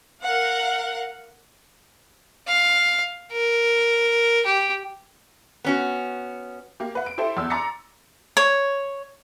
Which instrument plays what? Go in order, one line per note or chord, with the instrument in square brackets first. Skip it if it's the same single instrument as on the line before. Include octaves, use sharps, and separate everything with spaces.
[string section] A#4 F5 F#5
[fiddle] F5
A#4
G4
[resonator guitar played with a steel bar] B3 C#4 F#4
[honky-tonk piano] A#3 G4
B4 F#5
D7
E4 G4 A4 C5 E5
E2 E6
A#5 C6 D6 A6 A#6 C#7
[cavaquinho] C#5